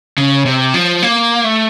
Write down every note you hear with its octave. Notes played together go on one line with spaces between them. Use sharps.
C#3
C3
F3
A#3
A3